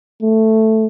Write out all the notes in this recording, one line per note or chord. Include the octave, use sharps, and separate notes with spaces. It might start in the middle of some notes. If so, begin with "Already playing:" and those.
A3